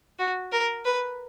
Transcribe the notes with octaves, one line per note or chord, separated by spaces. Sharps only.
F#4
A#4
B4